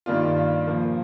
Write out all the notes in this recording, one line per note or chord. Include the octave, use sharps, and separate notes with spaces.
G2 D#3 A#3 D4 F4
A#2 F3 A#3